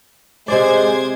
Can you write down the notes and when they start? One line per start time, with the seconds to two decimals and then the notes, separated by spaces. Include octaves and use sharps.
0.48 C3 G#3 C5 D5 G#6